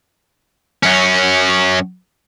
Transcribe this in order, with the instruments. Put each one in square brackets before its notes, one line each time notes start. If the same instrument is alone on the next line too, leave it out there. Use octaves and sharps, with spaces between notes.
[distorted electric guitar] F#2 C#4